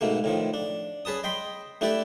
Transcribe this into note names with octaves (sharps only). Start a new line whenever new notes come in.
G#2 B2 A3 A#3
A2 D#3 F3
D4
C#4 G#4 B4 A5 D#6
D#5 G5 B5 C6
A3 D4 E4 G4 B4 D5